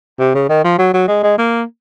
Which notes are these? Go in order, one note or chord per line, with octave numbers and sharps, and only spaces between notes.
C3
C#3
D#3
F3
F#3
F#3
G#3
G#3
A#3